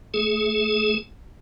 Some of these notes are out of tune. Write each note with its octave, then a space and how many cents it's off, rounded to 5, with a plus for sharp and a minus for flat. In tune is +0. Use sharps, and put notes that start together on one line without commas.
A3 +0 G#4 +30